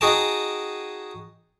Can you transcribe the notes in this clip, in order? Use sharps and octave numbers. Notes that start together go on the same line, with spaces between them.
D#4 F#4 G#4 G5 A5